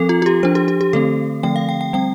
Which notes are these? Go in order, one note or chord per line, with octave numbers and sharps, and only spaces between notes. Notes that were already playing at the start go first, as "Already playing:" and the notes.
Already playing: F3 C4 A4
F4
F4
G4
F3 D4 C5
G4
G4
G4
D3 A3 C4 A4
D3 F3 A3 C4 G5
F5
G5
G5
G3 C4 G5